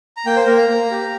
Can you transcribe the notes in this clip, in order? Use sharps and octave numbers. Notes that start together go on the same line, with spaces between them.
A#5
A#3 G5
C5
A#3 A#4
A#5
A#3
G4